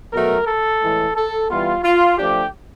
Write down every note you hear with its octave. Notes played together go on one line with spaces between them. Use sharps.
B2 F#3 A3 A#4
A4
A2 E3 G#3
A4
E3 G3 B3 F4
F4
F3 A3 D4 G4